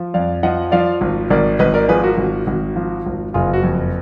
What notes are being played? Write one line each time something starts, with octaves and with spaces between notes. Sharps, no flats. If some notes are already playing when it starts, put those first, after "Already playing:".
Already playing: F3
F2 D5 F5
F3 D#5 F#5
F3 D5 F5
G#1
G#1 A#4 D5
G#1 B4 D#5
A#4 D5
F3 G#4 B4
F#4 A#4
G#1
G#1
F3
G#1
F#1 F4 G#4
F#4
F2